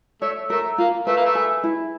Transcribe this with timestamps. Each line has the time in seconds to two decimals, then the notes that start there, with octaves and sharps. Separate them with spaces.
0.21 A3 C#5
0.50 A3 A#4
0.78 A#3 F4
1.07 A3 B4
1.16 A#3
1.25 A3
1.35 G#4
1.64 E4